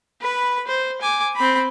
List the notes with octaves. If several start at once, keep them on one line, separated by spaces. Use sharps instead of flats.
B4 B5
C5
G#5 D6
C4 B5